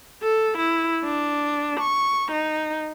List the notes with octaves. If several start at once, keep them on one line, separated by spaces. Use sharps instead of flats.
A4
E4
D4
C#6
D#4